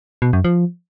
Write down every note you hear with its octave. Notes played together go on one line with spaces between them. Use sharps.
B2
F#2
F3